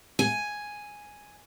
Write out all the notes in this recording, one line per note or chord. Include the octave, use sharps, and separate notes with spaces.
G#5